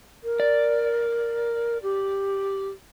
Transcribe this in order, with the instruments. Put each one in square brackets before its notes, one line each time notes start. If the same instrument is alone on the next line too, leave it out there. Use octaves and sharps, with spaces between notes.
[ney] A#4
[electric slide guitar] D5
[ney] G4